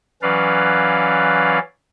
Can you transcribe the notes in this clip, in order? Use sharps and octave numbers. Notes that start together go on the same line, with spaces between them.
E3 F#3 C#4 B4 D5 F5